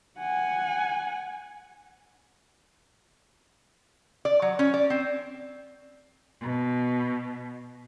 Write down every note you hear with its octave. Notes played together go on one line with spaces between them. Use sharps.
F#5 G#5
D5
F#3
C#4
D5
C4
B2